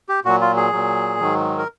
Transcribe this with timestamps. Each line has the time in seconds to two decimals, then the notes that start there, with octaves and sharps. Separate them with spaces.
0.09 G4
0.25 A#2 F#3 F#4
0.41 F4
0.57 G#4
0.72 A#2 F#3
1.20 G#2 D#3 F#3
1.58 A#4